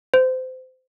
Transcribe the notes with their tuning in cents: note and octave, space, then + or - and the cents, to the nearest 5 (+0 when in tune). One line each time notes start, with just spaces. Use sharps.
C5 -25